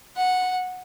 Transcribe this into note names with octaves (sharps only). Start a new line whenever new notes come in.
F#5